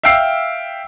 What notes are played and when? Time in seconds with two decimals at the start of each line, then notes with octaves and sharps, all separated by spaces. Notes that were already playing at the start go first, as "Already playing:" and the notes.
0.04 E5 F5 G5 E6 C7